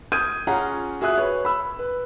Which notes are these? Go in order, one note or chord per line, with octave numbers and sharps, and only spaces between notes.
D#6 G6 G#6 D#7
C#4 F4 G#4 F#5 A#5
F#4 G#4 E5 D#6 F#6
B4 C#5
B5 E6
B4